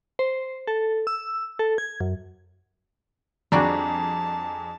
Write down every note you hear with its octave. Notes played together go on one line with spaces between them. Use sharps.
C5
A4
E6
A4
G#6
F#2
F2 G3 D4 F#4 G#4 A5 A#5